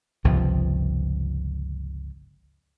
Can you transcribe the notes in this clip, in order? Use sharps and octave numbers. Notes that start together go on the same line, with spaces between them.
G1 C#2 C3 F3